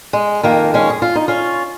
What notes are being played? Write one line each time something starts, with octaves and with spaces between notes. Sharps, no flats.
G#3
F2 D#3 A#3
G#3 C#4
G#4
F4
D#4
C#4 F4